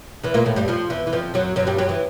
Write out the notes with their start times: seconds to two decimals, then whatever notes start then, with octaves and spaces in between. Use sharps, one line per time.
0.23 E2 E3
0.34 A#2 A#3
0.46 A2 A3
0.56 G2 G3
0.68 F2 F3
0.90 E2 E3
1.07 E3
1.13 F2 F3
1.34 F#2 F#3
1.56 F#2 F#3
1.67 G2 G3
1.78 F#2 F#3
1.89 E3